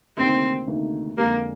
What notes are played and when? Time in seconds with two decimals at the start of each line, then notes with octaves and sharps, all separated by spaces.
0.17 D2 C3 D#3 A#3 C4 D#4
0.67 D2 C3 D#3 A#3 D#4
1.17 F2 D3 G#3 A#3